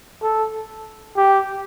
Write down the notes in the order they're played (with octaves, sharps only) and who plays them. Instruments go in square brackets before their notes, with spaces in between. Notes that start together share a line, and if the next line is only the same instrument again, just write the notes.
[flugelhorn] A4
G4